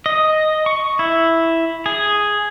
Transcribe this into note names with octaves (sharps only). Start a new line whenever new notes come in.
D#5
C#6
E4
G#4